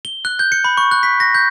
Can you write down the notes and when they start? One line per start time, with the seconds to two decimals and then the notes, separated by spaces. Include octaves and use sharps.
0.05 G7
0.25 F#6
0.39 G6
0.52 C#7
0.64 B5
0.77 C#6
0.91 F#6
1.03 B6
1.20 A#6
1.35 G6